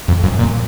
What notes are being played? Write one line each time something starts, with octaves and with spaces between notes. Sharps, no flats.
F2
F#2
A#2